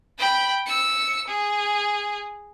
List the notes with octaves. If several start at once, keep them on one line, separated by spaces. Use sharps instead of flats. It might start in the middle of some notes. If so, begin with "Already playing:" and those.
G5 B5
E6 C#7
G#4